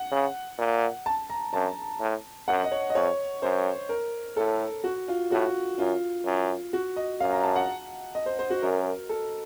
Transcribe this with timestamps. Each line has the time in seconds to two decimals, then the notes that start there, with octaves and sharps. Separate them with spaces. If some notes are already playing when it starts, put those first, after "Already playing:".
Already playing: F#5
0.12 C#3
0.58 A#2
1.06 A5
1.30 A#5
1.53 F#2 A5
2.00 A2
2.48 F#2 F#5
2.64 D#5
2.72 C#5
2.90 D#5
2.95 F2 C#5
3.42 F#2 C5
3.89 A#4
4.37 A2 A4
4.84 F#4
5.08 F4
5.32 A2 F#4
5.79 F#2 F4
6.25 F#2
6.73 F#4
6.96 D#5
7.20 F#2 F5
7.32 A#5
7.44 A5
7.56 F#5
8.15 D#5
8.26 C5
8.39 C5
8.50 F#4
8.62 F#2 A#4
9.09 A4